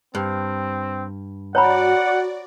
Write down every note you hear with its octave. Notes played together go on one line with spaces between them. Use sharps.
G2 C4
F#4 C#5 D5 F#5 A#5 B5